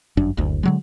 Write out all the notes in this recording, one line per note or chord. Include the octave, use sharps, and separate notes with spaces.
G1 F#2 D4
F#1 D2
D3 F#3 G#3